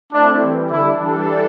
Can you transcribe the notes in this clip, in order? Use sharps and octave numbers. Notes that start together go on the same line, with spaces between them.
A3 C4 D4 E4
E3 G3 C4
D3 G3 D4 E4 A4
E3 G3 D4 A4